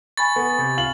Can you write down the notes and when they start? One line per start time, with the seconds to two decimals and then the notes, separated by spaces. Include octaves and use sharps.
0.17 G#5 B5 C#6 A6
0.36 B3
0.58 C3
0.77 F4 F#7